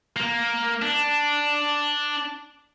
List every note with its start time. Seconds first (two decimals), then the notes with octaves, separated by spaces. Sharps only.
0.17 A#3
0.82 D4